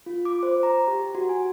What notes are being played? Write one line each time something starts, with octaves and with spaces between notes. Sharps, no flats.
F4
D6
C5
A#5
G4
F#4
G#5